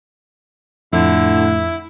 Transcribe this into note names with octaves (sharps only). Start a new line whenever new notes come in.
F2 A2 D3 E4